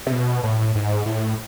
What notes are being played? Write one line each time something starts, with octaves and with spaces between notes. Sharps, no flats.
C3
B2
A2
G#2
A2